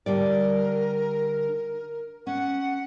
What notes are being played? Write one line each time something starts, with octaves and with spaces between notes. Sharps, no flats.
D3 G3 A#4 D5
C#4 F#5